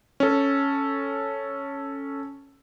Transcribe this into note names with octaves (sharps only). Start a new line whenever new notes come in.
C#4 A4